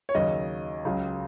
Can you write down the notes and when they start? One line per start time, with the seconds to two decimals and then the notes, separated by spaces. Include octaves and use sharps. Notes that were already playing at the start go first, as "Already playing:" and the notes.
0.09 C#5
0.15 D#2 C#3 F#3 D#5
0.85 C#2 C#3 F#3